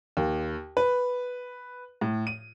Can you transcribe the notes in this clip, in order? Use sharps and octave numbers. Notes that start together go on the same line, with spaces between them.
D#2
B4
A2
D#7